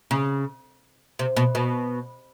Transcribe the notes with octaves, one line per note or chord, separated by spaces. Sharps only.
C#3
C3
B2
B2